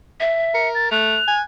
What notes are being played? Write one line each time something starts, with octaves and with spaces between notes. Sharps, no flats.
E5
A#4 C#7
A6
A3 F#6 F7
G#5